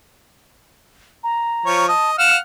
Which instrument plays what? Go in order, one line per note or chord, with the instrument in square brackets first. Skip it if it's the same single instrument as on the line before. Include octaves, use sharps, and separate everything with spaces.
[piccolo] A#5
[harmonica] F3 C#5
[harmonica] D#5 [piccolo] A5
[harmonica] F5 F#5 F6 [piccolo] E7